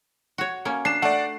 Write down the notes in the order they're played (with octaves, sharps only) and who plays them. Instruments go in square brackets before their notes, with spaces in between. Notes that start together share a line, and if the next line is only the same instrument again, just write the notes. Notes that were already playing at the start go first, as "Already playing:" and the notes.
[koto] F#4 C#5
A#3 C#4
[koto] D4 [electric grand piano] C7 E7
[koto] A3 [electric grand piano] D5 F#5